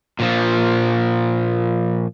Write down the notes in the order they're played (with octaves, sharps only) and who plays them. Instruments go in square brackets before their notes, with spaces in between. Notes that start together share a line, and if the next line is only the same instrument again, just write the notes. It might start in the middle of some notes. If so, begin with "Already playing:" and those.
[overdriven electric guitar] A#2 F3